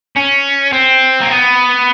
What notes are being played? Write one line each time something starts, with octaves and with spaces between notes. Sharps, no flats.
C#4
C4
A#3
B3